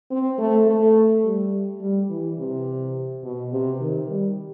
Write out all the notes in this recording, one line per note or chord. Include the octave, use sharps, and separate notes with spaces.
C4
A3
A3
G3
G3
E3
C3
B2
C3
D#3
G3